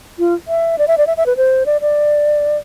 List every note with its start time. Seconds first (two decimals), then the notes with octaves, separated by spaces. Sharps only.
0.19 F4
0.48 E5
0.78 D5
0.88 E5
0.98 D5
1.07 E5
1.17 E5
1.26 B4
1.37 C5
1.66 D5
1.81 D5